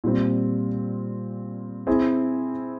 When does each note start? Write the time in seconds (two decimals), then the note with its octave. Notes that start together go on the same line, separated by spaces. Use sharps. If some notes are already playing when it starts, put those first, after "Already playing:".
0.04 A#2 G3 C4
1.87 C4 E4 G#4